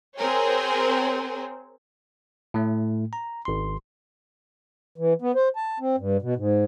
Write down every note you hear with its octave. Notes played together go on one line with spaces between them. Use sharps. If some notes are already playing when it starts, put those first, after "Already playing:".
C4 G#4 A#4 C5 C#5
A2 A3
A#5
G#1 C6
E3
B3
C5
A5
C4
G2
B2
G#2